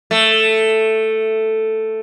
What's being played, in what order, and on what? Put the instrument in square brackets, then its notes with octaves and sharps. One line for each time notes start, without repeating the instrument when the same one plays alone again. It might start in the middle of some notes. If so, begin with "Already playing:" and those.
[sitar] A3